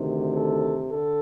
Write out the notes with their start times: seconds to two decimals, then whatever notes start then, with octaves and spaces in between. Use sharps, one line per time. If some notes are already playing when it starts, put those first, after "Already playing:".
Already playing: D2 C3 D#3
0.35 A4
0.92 D3 A4